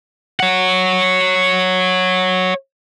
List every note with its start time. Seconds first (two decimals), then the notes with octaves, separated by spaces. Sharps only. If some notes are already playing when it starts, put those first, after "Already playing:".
0.40 C#5 F#5